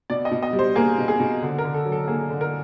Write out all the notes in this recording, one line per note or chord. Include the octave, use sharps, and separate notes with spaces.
B2 D5
D#5
B2
D#5
G3
C5
A#3 G#4
B2
G#4
B2
D3
A#4
D3
A4
F#3
A4
A#3 G#4
D3
A#4